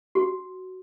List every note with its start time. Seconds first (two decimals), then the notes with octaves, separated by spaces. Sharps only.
0.15 F#4